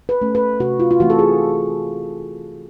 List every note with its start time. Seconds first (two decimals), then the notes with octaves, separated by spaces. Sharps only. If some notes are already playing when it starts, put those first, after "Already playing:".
0.09 B4
0.22 A3 C#4
0.35 B4
0.60 C3 F#4
0.80 F4
0.91 F4
1.00 E3 A3 C4 F#4
1.10 A4
1.19 G#4